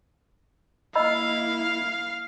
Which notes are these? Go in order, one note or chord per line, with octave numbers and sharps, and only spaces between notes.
A#3 E4 D#5 F5 B5 E6